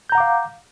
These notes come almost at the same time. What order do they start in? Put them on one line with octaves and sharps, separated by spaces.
G6 A#5 F#5 D6 F5